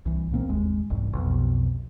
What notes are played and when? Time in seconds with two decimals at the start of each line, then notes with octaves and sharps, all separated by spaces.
0.05 C2 E3
0.31 C#2 A#2 A#3 C4
0.49 G1 D#2 G#3
0.90 E1 C2 G#2
1.13 B1 F2 B2